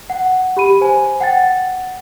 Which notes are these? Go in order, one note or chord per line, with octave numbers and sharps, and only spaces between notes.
F#5
G4 B5 D#7
C5 G#5
F#5 G5 A6